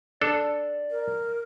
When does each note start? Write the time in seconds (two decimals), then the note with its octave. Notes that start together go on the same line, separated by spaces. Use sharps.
0.21 D4 A4 D5
0.91 A#4